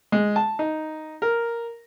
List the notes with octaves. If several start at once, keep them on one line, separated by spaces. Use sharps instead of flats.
G#3
A5
D#4
A#4